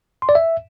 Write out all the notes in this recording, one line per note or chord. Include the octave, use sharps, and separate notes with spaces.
C6
D5
E5